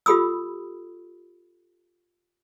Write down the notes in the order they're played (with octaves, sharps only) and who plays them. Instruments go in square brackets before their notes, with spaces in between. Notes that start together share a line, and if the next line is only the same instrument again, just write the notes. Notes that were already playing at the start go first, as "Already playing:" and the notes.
[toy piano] F4 G4 A4 B5 D#6 E6